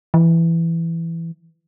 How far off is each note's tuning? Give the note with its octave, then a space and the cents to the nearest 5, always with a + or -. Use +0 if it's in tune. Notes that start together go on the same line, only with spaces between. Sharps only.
E3 +10